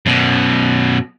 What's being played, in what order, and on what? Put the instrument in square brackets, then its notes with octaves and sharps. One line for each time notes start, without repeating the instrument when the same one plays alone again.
[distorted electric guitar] F#2 B2